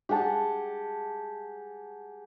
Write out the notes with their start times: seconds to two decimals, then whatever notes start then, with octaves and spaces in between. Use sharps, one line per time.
0.09 G4 G#4 F#5 A5